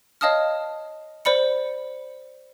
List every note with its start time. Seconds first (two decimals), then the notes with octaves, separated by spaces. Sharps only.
0.21 C#5 D#5 F5 A5 D#6 F6
1.25 C5 D5 B5 C#7